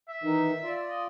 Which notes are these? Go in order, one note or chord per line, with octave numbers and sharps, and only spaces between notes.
E5
D#3 E3 D#4
F4 D5
D#5